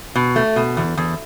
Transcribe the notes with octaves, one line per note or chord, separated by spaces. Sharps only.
B2
A3
B2
E2
E2